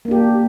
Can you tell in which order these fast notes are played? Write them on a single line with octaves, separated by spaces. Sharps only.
A#3 D4 G4